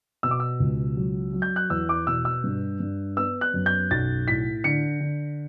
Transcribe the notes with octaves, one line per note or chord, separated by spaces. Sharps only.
B2 E6
D6
E6
C#2
F#3
F#3
G6
F#6
E2 E6
D6
B2 E6
E6
G2
G2
B3 E6
F#6
F#2
G6
B1 A6
A2 B6
D3 C#7
D3